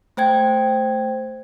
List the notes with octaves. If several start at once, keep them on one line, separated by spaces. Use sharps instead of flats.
A3 C5 G5 G#6